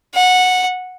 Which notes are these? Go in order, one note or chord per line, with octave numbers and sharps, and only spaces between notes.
F#5